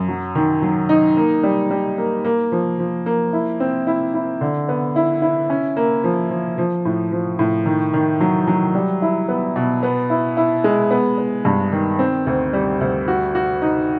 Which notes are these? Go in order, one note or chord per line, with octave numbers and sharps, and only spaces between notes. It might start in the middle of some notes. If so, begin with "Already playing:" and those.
Already playing: F#2
F#3
D#3
F#3
D#4
A#3
G3
G3
A#3
A#3
F3
F3
A#3
E4
C4
E4
E4
D3
B3
E4
E4
C#4
A#3
F3
F3
F3
A2
F3
A2
D#3
D#3
F#3
F#3
G3
E4
B3
B2
B3
E4
E4
G#3
B3
B3
G2
D#3
C4
D2
G3
D2
F#4
F#4
D#4